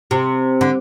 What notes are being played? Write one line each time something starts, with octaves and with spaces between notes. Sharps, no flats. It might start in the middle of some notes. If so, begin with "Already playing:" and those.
C3
D3